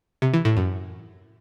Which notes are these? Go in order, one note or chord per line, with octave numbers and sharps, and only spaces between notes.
C3
E3
A2
F#2